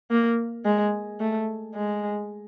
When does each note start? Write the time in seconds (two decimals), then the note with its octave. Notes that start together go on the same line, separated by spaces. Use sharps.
0.11 A#3
0.65 G#3
1.20 A3
1.75 G#3